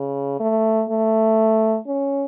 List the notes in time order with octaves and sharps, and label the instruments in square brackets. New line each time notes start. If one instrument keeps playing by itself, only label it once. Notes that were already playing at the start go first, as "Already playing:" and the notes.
Already playing: [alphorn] C#3
A3
A3
C#4